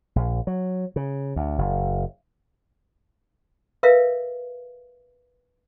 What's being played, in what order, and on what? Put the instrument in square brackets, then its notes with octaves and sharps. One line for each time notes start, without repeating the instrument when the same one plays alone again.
[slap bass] A#1
F#3
C#3
D2
F#1
[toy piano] A#4 B4 E5 F5